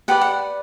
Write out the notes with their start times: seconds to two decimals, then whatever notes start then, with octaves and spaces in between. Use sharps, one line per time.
0.08 G4 B4 D5 F#5
0.21 F#5